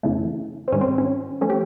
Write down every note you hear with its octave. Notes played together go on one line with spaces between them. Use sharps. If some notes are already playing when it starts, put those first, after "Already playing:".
F2 C#3 E3 A3
C4
G#2 D#3 G3 C#4
C4
C#4
F3 A3 C#4
G4